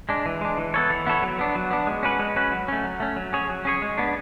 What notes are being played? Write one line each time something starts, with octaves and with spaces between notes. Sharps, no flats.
G#3 D4
E3
G#3 D4
E3
B3 E4 A4 C#5
E3
B3 E4 A4 C#5
F#3
B3 D4
F#3
B3 D4
G#3
C#4 F#4 B4
G#3
C#4 F#4 B4
F#3
A3 C#4
F#3
A3 C#4
F#3
C#4 G#4 C#5
F#3
C#4 G#4 C#5
G#3
B3 D4